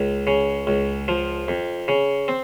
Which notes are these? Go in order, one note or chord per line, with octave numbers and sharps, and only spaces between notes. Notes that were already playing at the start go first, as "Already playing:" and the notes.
Already playing: C#2
C#3
C#2
F3
F2
C#3
C4